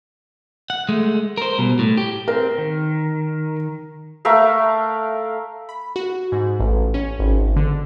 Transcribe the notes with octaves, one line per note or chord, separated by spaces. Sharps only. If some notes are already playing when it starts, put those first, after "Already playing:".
F#5
G#3 A3
A#4 C5
B2 G3
A2
G4
C4 A#4
D#3
A3 A#4 E5 F5
B5
F#4
G#2
A1
C#4
G#1
D3